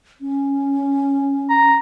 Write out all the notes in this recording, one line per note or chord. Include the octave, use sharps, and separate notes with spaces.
C#4
A#5